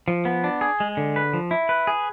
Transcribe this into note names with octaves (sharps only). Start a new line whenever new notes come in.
F3
B3
D4
G#4
G#3
D3
B4
F3
E4
B4
G#4